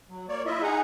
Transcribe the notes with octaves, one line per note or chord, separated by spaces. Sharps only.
F#3
A#3 C#5 D5
E4 F4 D#5 E5
D#4 G#4 F#5 G#5 A#5